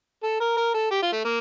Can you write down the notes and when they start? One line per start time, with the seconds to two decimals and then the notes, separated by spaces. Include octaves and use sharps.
0.23 A4
0.40 A#4
0.57 A#4
0.74 A4
0.91 G4
1.02 F4
1.13 A3
1.25 A#3